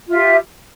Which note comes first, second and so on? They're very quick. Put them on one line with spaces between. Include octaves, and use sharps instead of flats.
F4 E5 G4